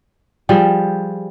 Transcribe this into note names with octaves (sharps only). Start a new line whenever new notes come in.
F3 G3 G#4